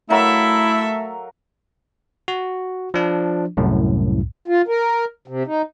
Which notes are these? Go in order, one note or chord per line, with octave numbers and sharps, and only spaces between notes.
F#3 A3 E4 A4 A#4 E5 F5
F#4
F3 D4
C2 F#2 A2
F4
A#4
C3
D#4